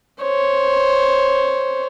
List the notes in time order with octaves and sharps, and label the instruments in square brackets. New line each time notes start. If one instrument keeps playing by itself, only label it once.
[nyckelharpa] C5 C#5